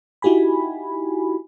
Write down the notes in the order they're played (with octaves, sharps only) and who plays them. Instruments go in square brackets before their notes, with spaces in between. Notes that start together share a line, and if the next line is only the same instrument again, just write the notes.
[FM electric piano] D#4 E4 F#4 G4 G#5 B5